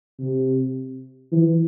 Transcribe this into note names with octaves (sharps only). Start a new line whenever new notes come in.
C3
E3